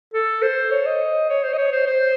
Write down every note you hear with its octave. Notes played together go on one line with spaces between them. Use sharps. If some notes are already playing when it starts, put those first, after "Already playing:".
A4
C5
C#5
D#5
C#5
C5
D#5
C#5
C5
C5